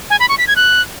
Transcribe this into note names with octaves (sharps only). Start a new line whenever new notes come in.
G#5
B5
C#6
B6
G#6
F#6